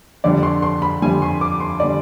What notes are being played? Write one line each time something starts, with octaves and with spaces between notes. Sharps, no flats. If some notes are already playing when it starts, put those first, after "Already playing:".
F2 D3 G3 D5
C6
C6
B5
F2 D3 G3 G#5
C6
D6
C6
D3 G3 D5